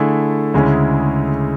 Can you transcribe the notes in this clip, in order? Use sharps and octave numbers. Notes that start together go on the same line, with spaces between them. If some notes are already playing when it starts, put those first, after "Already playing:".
Already playing: D3 A3 E4 G#4
D2 C#3 G#3 C#4 E4